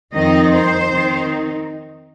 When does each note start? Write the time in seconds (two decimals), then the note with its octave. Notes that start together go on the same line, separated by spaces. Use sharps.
0.13 F2 D#3 C4 D#4 D#5
0.53 C5
0.90 D#3 C4 D#4